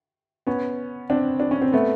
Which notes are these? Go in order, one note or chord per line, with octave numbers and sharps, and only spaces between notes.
B3 C#4
C4 D4
D4
C#4
C4
A3 B3